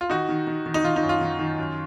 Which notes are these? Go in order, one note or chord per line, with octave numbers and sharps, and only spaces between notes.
F4
D#3 D#4 F#4
D#3
D#3
D#3
D#4
D#3 F4
D#4
F#2
F4
D#3
D#3
F#2